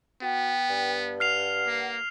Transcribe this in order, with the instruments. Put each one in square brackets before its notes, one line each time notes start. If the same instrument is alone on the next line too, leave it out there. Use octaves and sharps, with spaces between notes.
[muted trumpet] B3 [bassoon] F#4 [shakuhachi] G5
[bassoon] G2
[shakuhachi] F#5 [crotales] F6 C7 F7
[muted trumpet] A#3